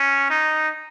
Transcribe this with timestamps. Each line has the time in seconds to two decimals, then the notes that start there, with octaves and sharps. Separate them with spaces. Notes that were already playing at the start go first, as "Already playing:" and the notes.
Already playing: C#4
0.30 D#4